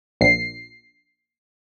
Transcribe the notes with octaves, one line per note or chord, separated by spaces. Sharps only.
A#1 C7